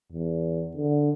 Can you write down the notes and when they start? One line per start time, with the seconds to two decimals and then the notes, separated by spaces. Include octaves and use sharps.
0.12 E2
0.77 D3